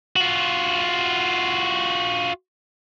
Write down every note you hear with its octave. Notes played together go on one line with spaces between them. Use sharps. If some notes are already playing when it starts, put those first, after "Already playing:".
F4 F#4